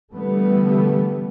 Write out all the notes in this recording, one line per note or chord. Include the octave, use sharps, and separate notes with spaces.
D3 E3 G3 A3 B3